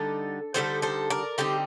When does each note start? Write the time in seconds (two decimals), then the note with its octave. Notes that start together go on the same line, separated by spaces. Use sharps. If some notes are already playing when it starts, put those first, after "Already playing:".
Already playing: D3 G3 D#4 A4
0.54 D3 G3 C4 D#4 A4 C5
0.82 A4 C5
1.10 A#4 D5
1.38 D3 G3 C4 D#4 G4